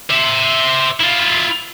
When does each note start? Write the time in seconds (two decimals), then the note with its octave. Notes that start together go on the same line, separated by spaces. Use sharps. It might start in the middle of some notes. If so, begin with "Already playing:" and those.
0.10 C5 E5
1.01 E4 F4